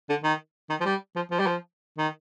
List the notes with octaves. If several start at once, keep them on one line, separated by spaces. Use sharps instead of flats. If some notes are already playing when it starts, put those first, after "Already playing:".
D3
D#3
D#3
F3
G3
F3
F3
G3
F3
D#3